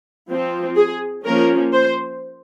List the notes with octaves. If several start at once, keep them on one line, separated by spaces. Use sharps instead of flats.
F3 C4
G#4
F3 A#3 C#4 A#4
C5